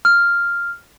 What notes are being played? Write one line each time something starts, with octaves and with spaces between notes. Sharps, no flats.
F6